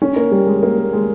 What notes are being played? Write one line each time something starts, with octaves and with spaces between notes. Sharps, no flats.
C#4
A#3
G3
G#3
A#3
G#3